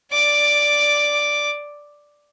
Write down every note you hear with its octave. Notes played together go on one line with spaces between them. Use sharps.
D5 D6